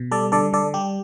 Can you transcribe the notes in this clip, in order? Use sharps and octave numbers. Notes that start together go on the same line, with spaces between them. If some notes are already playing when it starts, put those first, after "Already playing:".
Already playing: B2
G3 A4 D5
D3 A4 D5
D3 A4 D5
G3 G4